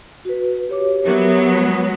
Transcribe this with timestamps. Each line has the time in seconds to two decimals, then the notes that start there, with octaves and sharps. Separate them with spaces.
0.25 F#4 B4
0.69 G4 C#5 D6
1.05 F#3 B3 G4 A#4 E5
1.56 G#3